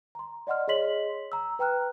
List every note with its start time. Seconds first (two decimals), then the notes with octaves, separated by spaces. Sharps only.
0.15 A#5 C6
0.47 D5 D#5 F#5 C6 F6
0.68 G#4 C#5 D#5 C6 B6 F#7
1.32 A#5 E6
1.59 B4 G5 A#5 F6 F#6